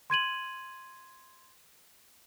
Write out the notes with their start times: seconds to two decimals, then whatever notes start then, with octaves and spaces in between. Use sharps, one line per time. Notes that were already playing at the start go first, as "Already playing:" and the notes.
0.10 C6 G#6 D#7 F#7